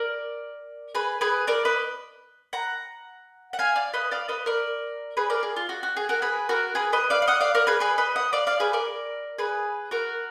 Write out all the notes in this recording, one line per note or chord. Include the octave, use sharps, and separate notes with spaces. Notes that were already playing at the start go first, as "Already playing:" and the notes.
Already playing: A#4 D5
G#4 B4
G#4 B4
A#4 D5
B4 D#5
F#5 A#5
F#5
F5 G#5
D5 F5
B4 D#5
D5 F5
B4 D#5
A#4 D5
G#4 B4
A#4 D5
G#4
F4
F#4
F#4
G#4
F#4 A#4
G#4 B4
F#4 A#4
G#4 B4
B4 D#5
D5 F5
F5
D#5 F#5
D5 F5
A#4 D5
G#4 B4
G#4 B4
B4 D#5
D#5 F#5
D5 F5
D5 F5
G#4 B4
A#4 D5
G#4 B4
F#4 A#4